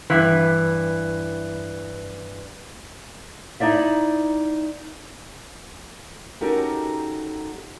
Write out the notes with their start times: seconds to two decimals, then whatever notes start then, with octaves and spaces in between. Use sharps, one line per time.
0.10 G2 E3
3.60 D#4 E4 D5 E5
6.41 C#4 D#4 F#4 G4 A4 A#4